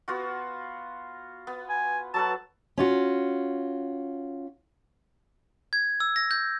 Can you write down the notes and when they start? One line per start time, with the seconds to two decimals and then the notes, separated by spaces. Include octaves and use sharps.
0.08 B3 F4 F#4
1.47 B3
1.69 G#5
2.14 F#3 A4 B4 A5
2.78 C#4 F4 F#4
5.73 G#6
6.00 E6
6.16 A#6
6.31 G6